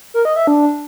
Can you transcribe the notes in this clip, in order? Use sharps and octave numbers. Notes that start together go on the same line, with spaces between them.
A#4
D#5
E5
D4